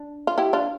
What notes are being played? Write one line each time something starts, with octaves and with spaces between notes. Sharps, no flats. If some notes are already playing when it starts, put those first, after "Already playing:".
Already playing: D4
F4
E4 G4
D4 F4